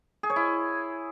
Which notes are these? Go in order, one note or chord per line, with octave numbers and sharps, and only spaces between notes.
G#4
C#5
E4